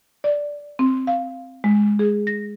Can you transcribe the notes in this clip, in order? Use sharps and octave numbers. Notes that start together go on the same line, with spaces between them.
D5
C4
F5
G#3
G#4
A#6